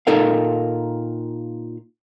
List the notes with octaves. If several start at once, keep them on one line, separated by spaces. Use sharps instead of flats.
A#2 D#4 A4 A#4 F5